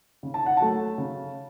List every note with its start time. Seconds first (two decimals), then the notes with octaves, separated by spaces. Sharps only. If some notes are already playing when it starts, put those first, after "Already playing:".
0.23 C#3
0.34 A5
0.46 F#5
0.57 F#3 A3 A5
0.98 C#3